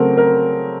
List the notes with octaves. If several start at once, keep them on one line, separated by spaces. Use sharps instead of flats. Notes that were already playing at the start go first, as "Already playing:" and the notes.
Already playing: C#3 F#3 A3 C4 A#4
A#4